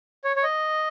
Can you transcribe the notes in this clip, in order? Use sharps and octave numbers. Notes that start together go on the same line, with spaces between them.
C#5
C#5
D#5